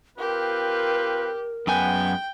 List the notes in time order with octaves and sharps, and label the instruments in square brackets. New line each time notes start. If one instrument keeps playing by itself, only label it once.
[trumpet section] C4 F4 B4 [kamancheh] G4 [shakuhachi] A#4
[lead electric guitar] F#2 G#5 [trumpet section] G#3 B3 [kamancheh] G5